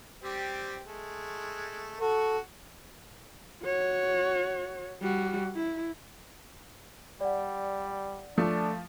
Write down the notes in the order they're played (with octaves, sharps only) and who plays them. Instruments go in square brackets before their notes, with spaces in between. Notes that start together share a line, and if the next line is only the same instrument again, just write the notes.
[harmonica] G3 C4 G4
G#3 A3
[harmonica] F#4 C#6 [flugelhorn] A4
[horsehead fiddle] F#4 C#5
G3 F#4
E4
[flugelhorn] G3 [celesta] D5 F#5
[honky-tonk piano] F3 [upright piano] A3 [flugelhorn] D4